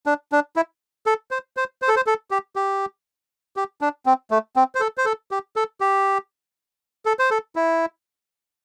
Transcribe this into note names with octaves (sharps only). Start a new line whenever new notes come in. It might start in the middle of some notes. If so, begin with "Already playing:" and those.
D4
D4
E4
A4
C5
C5
C5
A4
C5
A4
G4
G4
G4
D4
C4
A3
C4
C5
A4
C5
A4
G4
A4
G4
A4
C5
A4
E4